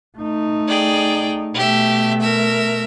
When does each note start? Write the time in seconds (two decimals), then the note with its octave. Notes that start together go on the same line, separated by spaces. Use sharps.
0.18 A3 D#4
0.68 G#4 D5 G5
1.55 B2 A3 G4 E5
2.20 A#4 E5